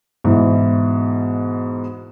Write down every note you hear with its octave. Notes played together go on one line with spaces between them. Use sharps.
G#2 B2 E3